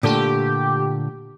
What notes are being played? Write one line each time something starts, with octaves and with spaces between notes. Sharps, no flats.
A#2 D3 A3 G4